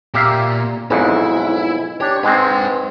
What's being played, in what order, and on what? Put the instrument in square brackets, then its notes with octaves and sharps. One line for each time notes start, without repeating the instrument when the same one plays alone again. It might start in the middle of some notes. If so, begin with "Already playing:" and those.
[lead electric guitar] A#2 [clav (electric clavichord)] G4 E5 F5
[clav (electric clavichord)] B1 F2 G#2 [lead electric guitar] E4
[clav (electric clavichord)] D4 G4 [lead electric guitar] C#5
[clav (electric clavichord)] G#2 G#3 C4 [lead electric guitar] B4 G5